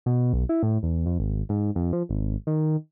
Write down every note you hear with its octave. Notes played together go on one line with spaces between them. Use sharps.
B2
B1
E4
A2
E2
F2
G#1
G#2
F2
F3
G#1
D#3